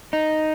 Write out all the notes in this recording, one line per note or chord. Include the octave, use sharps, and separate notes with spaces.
D#4